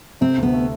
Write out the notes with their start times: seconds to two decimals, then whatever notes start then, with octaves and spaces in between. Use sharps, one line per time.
0.21 C3 C4
0.38 D2
0.43 B3
0.54 A3